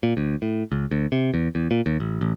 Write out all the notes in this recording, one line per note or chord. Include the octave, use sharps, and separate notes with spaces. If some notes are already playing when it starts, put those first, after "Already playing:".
A#2
D2
A2
C#2
D2
C3
E2
E2
A#2
D#2
A1
A1